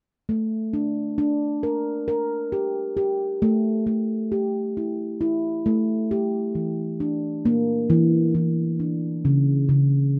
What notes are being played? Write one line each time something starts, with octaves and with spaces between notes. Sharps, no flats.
A3
D4
D4
A#4
A#4
G4
G4
A3
A3
G4
E4
E4
A3
G4
E3
D4
A#3
E3
E3
D4
C#3
C#3